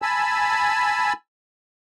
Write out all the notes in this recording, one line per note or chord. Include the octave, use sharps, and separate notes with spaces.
G#5 A5 B5 E6